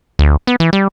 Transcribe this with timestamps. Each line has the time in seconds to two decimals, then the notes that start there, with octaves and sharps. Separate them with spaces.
0.19 D2
0.47 B3
0.60 E3
0.73 G3